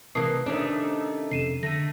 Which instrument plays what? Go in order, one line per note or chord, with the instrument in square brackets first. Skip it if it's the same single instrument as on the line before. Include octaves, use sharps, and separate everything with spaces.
[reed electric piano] C3 [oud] E3 A#3 [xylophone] A5 D#6 C7
[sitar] C3 D#3 A3 [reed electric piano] C#4 [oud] D4
[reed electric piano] F2 C3 [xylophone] C7 D#7 E7
[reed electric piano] D3 [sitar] A3 [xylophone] A#6 D#7